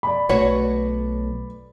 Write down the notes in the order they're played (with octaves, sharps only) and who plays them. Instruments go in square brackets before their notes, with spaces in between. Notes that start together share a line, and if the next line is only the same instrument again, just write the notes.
[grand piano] D5 B5
[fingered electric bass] B1 A3 [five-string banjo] F#4 B4 [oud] C#5